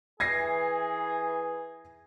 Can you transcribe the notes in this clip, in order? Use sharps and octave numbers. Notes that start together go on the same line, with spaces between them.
E3 G#4 G#6 A#6 C7